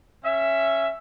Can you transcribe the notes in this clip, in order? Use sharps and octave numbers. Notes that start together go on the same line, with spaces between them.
C#4 E5